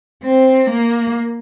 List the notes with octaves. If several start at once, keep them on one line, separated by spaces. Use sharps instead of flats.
C4
A#3